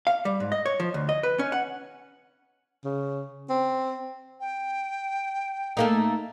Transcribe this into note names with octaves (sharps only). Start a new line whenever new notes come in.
F5
G3
G#2
D#5
C#5
F3
D2
D#5
B4
C#4
F#5
C#3
C4
G5
A3 A#3 D#4